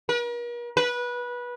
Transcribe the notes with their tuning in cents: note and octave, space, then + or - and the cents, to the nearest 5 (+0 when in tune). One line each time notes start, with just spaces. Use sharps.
A#4 +45
B4 -20